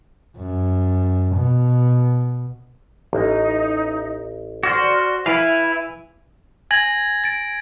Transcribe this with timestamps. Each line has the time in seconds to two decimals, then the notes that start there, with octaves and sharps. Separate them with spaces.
0.37 F#2
1.35 B2
3.13 A1 D#4 D#5
4.63 F#4 C5 D5 F6
5.26 E3 E4 B4 E5 F5 B5
6.71 G#5 G#6 A#6 F#7
7.24 A6 D7